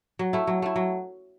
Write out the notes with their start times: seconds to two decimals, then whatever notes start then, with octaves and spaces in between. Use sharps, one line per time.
0.19 F#3
0.33 A3 E4
0.47 F#3
0.62 A3 E4
0.76 F#3